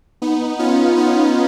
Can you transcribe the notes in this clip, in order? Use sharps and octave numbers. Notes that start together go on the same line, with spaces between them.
B3 D#4
C#4 F4
B3 D#4